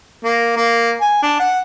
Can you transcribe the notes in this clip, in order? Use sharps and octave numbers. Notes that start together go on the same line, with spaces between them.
A#3
A#3
G#5
D4
F#5